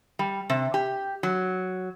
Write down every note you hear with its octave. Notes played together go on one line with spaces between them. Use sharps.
G3
C3
G4
F#3